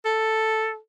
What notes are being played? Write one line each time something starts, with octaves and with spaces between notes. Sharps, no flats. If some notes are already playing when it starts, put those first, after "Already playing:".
A4